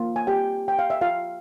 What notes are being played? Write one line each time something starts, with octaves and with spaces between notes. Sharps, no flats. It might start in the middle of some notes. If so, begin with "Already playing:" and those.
Already playing: A#3 F4
G#5
G4 G5
G5
F5
E5
F4 F5